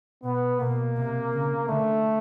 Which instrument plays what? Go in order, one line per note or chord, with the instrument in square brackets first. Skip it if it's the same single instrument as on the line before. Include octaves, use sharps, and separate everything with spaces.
[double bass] B2 [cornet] B3
[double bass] B2 [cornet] A#3
[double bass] C3
C#3
[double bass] D3 [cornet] A3